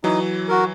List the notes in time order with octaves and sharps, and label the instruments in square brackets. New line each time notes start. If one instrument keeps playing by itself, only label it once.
[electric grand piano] E3 F#3 [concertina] D#4
[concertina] F#4 A#4